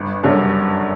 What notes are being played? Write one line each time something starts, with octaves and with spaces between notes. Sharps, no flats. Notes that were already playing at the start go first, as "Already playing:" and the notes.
Already playing: G1
F#2 D3 G3 C#4